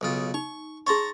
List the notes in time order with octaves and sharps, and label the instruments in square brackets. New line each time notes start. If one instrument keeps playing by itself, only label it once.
[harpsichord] B1 C#3 F4
[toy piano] D#4 [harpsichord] C#6
[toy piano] G#4 C6 C#6 [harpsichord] C#5 A5 A#5